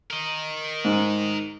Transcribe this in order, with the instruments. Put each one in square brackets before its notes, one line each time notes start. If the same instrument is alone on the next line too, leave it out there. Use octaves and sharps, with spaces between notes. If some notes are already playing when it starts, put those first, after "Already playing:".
[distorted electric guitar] A#4 D#5
[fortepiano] G#2